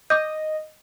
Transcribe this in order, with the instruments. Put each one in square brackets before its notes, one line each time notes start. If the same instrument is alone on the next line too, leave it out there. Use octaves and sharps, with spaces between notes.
[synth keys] D#5 [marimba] D6 G6